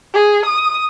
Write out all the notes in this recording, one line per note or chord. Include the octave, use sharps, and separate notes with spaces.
G#4
D#6